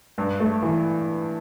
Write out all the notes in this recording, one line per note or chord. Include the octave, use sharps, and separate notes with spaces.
G2
A3
E3